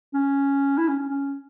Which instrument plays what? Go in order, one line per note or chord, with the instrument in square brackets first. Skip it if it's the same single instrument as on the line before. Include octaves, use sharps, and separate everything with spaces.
[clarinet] C#4
E4
C#4
C#4
C#4